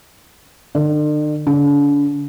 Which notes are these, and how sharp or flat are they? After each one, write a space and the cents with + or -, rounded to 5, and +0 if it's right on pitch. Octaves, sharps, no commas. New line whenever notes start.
D3 +45
D3 -40